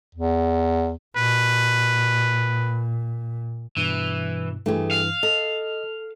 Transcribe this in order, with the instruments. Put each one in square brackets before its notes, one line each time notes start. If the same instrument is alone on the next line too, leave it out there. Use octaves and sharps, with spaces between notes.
[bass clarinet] E2
[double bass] A#2 [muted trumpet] B4
[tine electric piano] G2 B2 [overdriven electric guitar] E3
[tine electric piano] G2 E3 [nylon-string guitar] A3 G4 G#4
[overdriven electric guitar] F5
[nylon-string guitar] A4 [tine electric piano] D#5